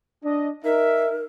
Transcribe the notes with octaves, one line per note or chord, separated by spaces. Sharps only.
D4 D#5
D#4 A#4 E5